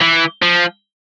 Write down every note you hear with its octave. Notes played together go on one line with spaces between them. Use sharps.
E3
F3